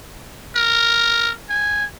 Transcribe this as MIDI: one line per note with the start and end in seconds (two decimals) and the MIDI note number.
0.56 1.32 70
1.49 1.85 80